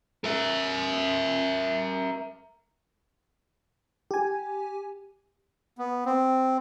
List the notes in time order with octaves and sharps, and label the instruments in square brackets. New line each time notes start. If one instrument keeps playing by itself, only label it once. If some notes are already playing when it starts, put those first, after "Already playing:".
[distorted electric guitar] A#4 E5
[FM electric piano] G4 G#5
[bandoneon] B3
C4